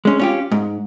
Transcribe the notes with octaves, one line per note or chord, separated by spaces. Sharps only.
G#3 C#4
C#4 F4 G4
G#2